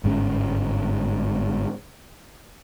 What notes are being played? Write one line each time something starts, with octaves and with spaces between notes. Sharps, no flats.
G1 G#2 G#3 C#4